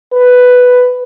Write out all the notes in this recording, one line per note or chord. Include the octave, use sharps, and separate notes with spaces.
B4